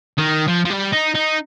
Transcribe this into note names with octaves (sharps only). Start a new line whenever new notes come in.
D#3
F3
F3
G3
D#4
D#4